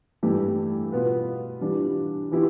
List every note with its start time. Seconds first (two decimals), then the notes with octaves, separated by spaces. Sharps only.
0.23 G2 E3 A3 E4 G4
0.92 B2 B3 F4 B4
1.60 E3 G3 D4 F4
2.31 E3 B3 E4 G4